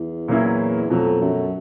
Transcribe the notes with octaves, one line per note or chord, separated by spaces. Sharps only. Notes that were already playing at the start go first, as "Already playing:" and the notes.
Already playing: E2
A#2 F#3 A#3 C#4 E4
F2 B2 F#3 A3
F#2